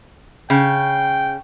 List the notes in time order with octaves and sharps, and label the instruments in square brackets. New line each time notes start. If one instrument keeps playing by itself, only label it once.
[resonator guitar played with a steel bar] C#3 [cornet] G5